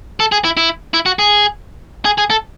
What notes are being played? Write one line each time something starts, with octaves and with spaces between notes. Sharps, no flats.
A4
G#4
E4
E4
E4
F#4
G#4
G#4
G#4
A4